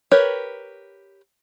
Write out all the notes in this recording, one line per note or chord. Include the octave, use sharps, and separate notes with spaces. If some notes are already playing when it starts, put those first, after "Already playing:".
G4 A#4 B4 C#5